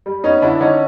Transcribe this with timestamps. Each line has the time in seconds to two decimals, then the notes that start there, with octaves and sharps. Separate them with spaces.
0.06 G3
0.24 B3 C#4 D#4
0.42 D3 D4 E4
0.60 D3 C#4 D#4